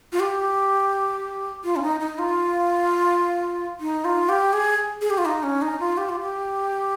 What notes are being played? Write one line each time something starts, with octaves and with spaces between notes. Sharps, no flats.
F4
G4
F4
C#4
D#4
D#4
F4
D#4
F4
G4
G#4
G#4
G4
F4
D#4
C#4
D#4
F4
G4
F4
G4